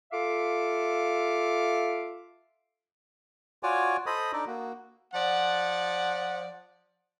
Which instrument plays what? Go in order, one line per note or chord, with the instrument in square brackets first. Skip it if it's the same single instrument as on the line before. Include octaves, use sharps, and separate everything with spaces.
[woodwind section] F4 A4 E5 F5 D6
[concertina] F4 F#4 C#5 D5 G#5
A4 C5 D#5 B5 D#6
D4 D#4 A4 D5
A#3 F#4
[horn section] F3 D5 F#5